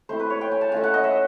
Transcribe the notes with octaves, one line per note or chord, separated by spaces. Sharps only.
A3 C4 E4 C5
B4
C#5
G5
G#5
A5
A3 C#4 F4 G#5
F#5
D#5
E5